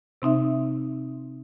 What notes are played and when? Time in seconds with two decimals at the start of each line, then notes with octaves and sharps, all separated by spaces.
0.22 C3 C4 D#4 E5